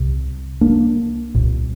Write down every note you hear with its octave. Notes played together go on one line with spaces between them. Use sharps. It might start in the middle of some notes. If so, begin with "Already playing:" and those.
Already playing: C2 C3
A#3 D4
C2 A#2